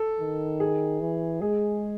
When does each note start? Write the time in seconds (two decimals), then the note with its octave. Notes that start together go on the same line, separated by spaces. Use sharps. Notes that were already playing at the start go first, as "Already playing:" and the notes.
Already playing: A4
0.20 D#3
0.60 G#4
1.01 E3
1.41 G#3 G#4